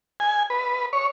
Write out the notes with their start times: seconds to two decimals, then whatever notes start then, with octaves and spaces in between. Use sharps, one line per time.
0.20 G#5
0.50 B4
0.93 C#5